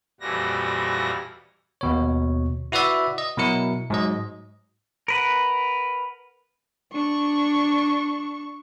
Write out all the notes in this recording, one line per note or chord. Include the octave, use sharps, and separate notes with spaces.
F2 A#2 E3 G3 F#4 A#6
D#2 B2 C#5
E4 F#4 B4 D5 E5
D#5
B2 F#3 E4 A#4 C#7
G#2 F#3 D#5
A#4 B4 F#5
D4 C#6